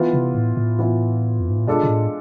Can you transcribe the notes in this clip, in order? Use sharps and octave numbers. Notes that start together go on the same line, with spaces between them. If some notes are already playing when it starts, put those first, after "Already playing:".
Already playing: E3 B3 F4
C3
A2
A2
E3 B3 F4
F2
G#2
A2
B2 G#3 D4 F4 A4
B2
A2